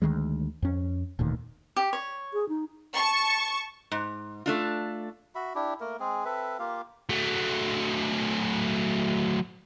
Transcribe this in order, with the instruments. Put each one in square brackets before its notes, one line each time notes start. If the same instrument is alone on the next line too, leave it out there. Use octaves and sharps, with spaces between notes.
[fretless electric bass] D2 D#3 G3 G#3
F2 C#4
E1 D2 A#2 D#3
[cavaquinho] G4
C#5
[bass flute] G#4
D#4
[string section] A5 C#6
[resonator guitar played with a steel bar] G#2
A3 D4 F4
[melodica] F#4 E5 B5
D4 E4 G4
A3 A#3 A#4
G#3 C4 G#4
C4 A4 B4 E5
A#3 F4 G4 F5
[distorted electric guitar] F#3 A3